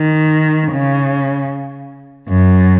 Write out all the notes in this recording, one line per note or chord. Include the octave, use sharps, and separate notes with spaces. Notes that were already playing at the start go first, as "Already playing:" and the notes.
Already playing: D#3
C#3
F#2